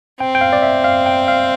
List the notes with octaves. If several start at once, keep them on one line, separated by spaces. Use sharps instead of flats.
C4 G5
G5
F5
D5
E5
F5
G5
F5